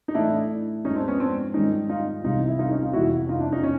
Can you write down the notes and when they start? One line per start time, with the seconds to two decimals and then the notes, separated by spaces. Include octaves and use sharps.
0.08 D#4
0.14 A2 E3 A3 D4 E4
0.84 G#2 F3 G#3 C#4 D#4
0.96 C4 D4
1.08 B3 C#4
1.20 C4 D4
1.54 G#2 D#3 G3 C#4 D#4
1.89 D#4 F4
2.24 C2 C3 E3 D#4 F4
2.48 E4
2.59 D#4 F4
2.71 C#4 D#4
2.82 D#4 F4
2.93 F2 C3 E3 E4 F#4
3.29 D#4 F4
3.40 D4 E4
3.52 C#4 D#4
3.63 C3 C#4